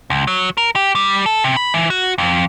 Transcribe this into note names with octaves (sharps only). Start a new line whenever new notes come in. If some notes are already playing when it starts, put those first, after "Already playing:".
C#2
F#3
A#4
G4
G3
A4
C3
B5
E3
F#4
F2